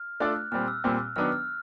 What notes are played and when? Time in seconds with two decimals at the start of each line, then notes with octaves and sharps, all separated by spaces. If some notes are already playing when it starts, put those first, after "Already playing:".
Already playing: F6
0.20 A3 D4 F4 A4 D5 F#6
0.52 A#2 G3 C4 F6
0.68 E6
0.84 A#2 G3 C4
1.16 D#3 F#3 B3 D4 F6
1.32 F6